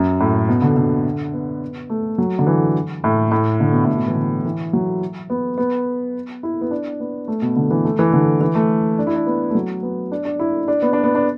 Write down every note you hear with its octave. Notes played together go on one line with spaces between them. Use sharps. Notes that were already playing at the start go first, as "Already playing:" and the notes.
Already playing: F#2
A2
B2
D3
D3
B3
A3
F#3
D3
E3
A2
A2
D3
B2
A2
B2
E3
D3
E3
F#3
B3
B3
E4
B3
D4
B3
A3
B2
D3
E3
A3
E3
D3
E3
A3
D4
E4
D4
B3
A3
F#3
B3
D4
D4
E4
D4
B3
D4
B3
D4